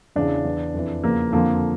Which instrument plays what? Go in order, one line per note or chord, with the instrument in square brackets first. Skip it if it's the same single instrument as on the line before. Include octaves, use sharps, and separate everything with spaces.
[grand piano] E2 C#3 E3 D4
E2 E3
F2 E3
E2 C#3 F3 A#3
F2 D3 F3 A#3